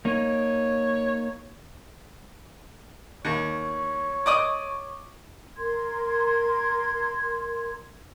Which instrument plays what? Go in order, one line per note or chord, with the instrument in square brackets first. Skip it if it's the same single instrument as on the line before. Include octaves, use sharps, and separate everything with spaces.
[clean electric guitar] A#3 D#4 [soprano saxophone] C#5
[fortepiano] D#2 [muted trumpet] C#5
[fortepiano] D5 D#5 D#6
[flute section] A#4 C6 G#6